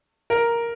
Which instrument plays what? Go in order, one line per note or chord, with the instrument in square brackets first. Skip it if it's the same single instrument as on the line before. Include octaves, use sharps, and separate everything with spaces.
[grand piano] A#4